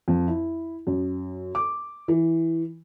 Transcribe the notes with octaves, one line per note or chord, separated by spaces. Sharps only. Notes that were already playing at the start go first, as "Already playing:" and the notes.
F2
E4
F#2
D6
E3